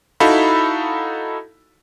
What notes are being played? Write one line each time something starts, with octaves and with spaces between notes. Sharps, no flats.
D#4 E4 F#4 A4 F5 B5